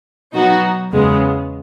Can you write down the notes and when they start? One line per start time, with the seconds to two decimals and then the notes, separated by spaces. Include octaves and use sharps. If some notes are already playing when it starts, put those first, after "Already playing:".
0.33 B2 F#3 B3 D#4 F#4
0.92 E2 C#3 G#3 B3